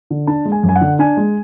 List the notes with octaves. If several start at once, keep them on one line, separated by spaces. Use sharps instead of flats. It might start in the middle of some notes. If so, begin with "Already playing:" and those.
D3
D4 A5
G#3
G#5
F#2
G#5
F#5
D3
D4 G#5
G#3